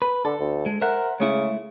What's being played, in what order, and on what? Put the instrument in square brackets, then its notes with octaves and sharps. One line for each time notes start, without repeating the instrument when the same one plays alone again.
[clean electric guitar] B4
[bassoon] D3 [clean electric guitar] A4
[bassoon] D2
[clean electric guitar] G#3
[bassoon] A#4 [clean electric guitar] C5 E5 F#5
[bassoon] C#3 [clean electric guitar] G#3 A3 E4